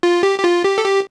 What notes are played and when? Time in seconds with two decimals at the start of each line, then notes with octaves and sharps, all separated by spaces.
0.03 F4
0.23 G4
0.39 G4
0.44 F4
0.64 G4
0.78 A4
0.84 G4